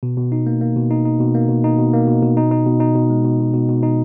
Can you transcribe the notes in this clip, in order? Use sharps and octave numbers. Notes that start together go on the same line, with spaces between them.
B2
B2
D#4
A#3
A#3
B2
D#4
D#4
B2
A#3
B2
D#4
B2
A#3
B2
B2
D#4
D#4
B2
D#4
B2
G#3
B2
B2
B2
B2
D#4